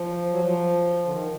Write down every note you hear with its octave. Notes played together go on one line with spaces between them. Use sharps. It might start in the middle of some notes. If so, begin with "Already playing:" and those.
Already playing: F3
F#3
F3
D3
D#3